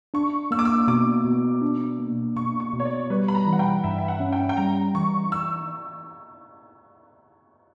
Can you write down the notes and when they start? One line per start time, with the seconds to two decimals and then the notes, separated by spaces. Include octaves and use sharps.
0.14 D4 C#6
0.51 A#3 E6
0.59 D6
0.65 E6
0.88 B2 D6
1.25 B2
1.62 D4
1.99 A#3
2.36 B2 C#6
2.60 C#6
2.73 B2
2.80 C#5
2.85 D5
3.10 G3 B4
3.28 B5
3.35 A#5
3.47 E3
3.53 F#5
3.59 G5
3.84 G2 E5
3.98 E5
4.08 F#5
4.20 C#4
4.33 G5
4.49 G5
4.57 G3 A#5
4.95 E3 C#6
5.32 E6